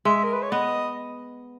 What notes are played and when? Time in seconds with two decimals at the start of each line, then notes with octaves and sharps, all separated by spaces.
0.05 G#3 E5
0.24 A#4
0.33 B4
0.43 C#5
0.52 B3 D#5